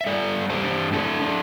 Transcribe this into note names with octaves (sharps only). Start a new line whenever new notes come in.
E5
G3 A4 D5
G2
G4 C5
D4
D4 E4 A4
D4